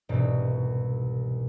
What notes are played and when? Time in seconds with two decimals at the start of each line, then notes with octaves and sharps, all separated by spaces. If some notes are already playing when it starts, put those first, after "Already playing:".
0.09 E1 C2 G#2 B2 G4